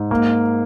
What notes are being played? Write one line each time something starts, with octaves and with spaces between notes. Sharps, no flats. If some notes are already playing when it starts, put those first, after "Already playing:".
Already playing: G#2
A#3